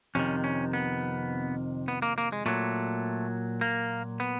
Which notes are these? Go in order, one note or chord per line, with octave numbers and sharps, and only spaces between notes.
F2 C3 D#3 C#4
C#4
B3
B3
A#3
A#3
G#3
A#2 F#3 A3
A#3
B3